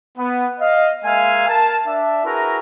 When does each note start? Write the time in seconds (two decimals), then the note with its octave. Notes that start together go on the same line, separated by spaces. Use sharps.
0.17 B3
0.60 D#5 F5
1.05 G#3 A#3 E5 F5 G#5
1.48 A#4 A5
1.87 D4 E5
2.24 E4 F#4 G#4 A#4 B4 A#5